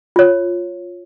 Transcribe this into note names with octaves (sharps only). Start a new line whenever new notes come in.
F4 C#5